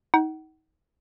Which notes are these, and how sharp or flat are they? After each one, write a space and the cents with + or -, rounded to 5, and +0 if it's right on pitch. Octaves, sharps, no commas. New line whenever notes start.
D#4 +30 F#5 +35